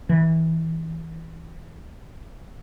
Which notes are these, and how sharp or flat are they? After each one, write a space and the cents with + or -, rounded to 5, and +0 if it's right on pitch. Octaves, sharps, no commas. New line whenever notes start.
E3 -20